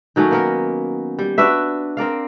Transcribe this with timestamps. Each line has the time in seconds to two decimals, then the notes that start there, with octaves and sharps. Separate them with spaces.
0.16 D#3 F#3 A3 C#4
0.31 A#3 B3 A#4
1.19 G3
1.38 D4 F#4 B4 E5
1.97 C4 A#4 D5 F5